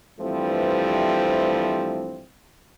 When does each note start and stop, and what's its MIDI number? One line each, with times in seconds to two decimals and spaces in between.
0.20 2.24 43
0.20 2.24 52
0.20 2.24 53
0.20 2.24 55
0.20 2.24 57
0.20 2.24 60